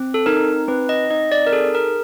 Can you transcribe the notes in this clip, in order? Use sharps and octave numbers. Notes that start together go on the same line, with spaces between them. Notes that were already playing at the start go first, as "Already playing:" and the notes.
Already playing: C4
A4
D#4 A#4
C4 B4
D#5
D#4 D#5
D5
A#4
G#4 A4
A#4